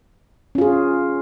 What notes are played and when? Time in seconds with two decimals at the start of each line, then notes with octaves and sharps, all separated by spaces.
0.55 C#4
0.58 F4
0.61 G#4